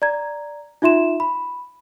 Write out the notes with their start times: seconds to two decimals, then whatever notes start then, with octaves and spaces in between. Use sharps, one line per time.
0.02 D5 A#5 G#6
0.82 D#4 F4 E5 C6 E7
1.20 B5